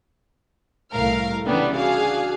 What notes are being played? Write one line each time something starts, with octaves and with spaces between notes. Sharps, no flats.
C2 A2 A3 A#4 F5 F6
C#3 E3 G3 B3 D4 G4
D4 F#4 G#4 F5